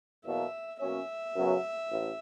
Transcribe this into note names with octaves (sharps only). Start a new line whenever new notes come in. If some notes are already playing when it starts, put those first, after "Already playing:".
E2 B2 F#3 A#3 E5
B2 F#3 A#3 C#4 E5
F#2 C#3 F#3 B3
A1